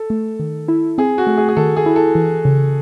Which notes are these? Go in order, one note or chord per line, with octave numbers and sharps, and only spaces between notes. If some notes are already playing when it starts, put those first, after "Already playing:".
Already playing: A4
A3
D#3
E4
C4 G#4
F#4
A3
G#4
G#4
D#3 A4
G#4
E4
A4
E3
C#3